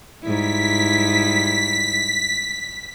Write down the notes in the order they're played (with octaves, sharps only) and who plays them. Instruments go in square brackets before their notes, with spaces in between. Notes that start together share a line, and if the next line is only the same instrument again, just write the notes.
[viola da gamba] G#2 G3 E4 [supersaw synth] B6